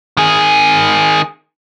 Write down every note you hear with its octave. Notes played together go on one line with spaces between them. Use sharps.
D#3 G#4